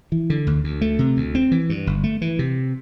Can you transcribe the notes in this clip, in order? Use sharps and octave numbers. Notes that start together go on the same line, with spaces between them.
E3
D3
D2
D2
A3
C3
D2
C4
E3
G2
G1
A3
E3
C3